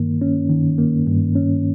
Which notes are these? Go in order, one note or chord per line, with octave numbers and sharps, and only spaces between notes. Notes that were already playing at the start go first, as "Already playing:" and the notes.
Already playing: G2 D#3 A#3
C#4
D#3
A#3
G2
C#4